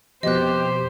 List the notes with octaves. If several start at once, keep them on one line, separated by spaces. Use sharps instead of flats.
F2 B2 G4 C5 D#5 F#6